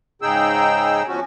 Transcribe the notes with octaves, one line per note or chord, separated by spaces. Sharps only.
G#2 C#3 D#4 G#4 G5 E6
E2 F3 C#4 F#4